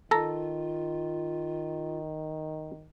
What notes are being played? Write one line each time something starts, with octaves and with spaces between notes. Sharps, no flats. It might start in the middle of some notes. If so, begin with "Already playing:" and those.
D#3 F4 A4 A#5